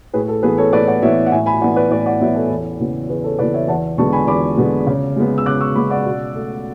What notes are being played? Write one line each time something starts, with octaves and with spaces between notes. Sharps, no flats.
A2 G#4 B4
A4
E3 B3 G#4 B4
A4 C#5
A2 B4 D5
D5 F#5
E3 B3 C#5 E5
F#5
A2 E5 G#5
G#5 B5
E3 B3 D5 F#5
B4 D5
A2 B4 D5
D5 F#5
E3 B3 C#5 E5
A4 C#5
E2
C#3 E3 B3
E2 G#4 B4
A4 C#5
C#3 E3 B3 B4 D5
C#5 E5
E2 F#5 A5
D3 G#3 B3 A5 C#6
G#5 B5
E2 B5 D6
D3 G#3 B3
C#3
G#3 B3
E6
C#3 D6 F#6
C#6 E6
G#3 B3 B5 D6
D5 F#5
B2
A3